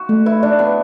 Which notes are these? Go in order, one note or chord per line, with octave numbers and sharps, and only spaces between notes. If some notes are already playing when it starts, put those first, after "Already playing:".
Already playing: F#4
A3
E4 B4
D4 D5
B3 B4